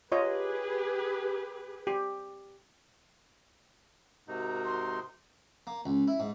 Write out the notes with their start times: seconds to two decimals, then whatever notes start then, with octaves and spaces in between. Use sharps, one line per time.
0.12 F4 G4 G#4 B4 C#5 D#5
1.87 G4
4.28 G#2 C3 D#4 F#4 A#4
4.64 C6
5.67 A#3
5.86 C#2
6.08 E4
6.20 G#2